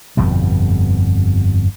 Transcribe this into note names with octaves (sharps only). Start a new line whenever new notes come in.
G1 F2 B2 G3